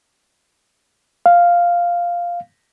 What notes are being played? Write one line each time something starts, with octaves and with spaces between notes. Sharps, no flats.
F5